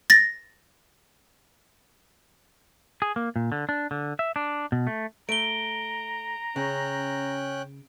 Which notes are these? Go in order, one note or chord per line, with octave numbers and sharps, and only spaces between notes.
A6 A#6
G#4
A#3
A#2
D3
D4
D3
E5
D4
B2
A3
A3 A#5 D7 G7
C#3 C#4 G5 F#6